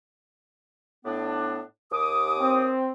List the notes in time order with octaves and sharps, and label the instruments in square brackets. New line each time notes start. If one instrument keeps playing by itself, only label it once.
[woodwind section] A2 B3 D4
D#2 D6 D#6
[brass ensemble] C4